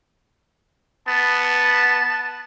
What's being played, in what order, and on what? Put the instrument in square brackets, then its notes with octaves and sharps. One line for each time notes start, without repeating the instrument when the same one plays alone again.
[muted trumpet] B3 [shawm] A5